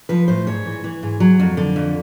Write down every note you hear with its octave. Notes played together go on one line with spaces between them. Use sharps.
F3 B4
A2 C5
G#2 C#5
E3
E3
G#2
F#3
F2
D3
F2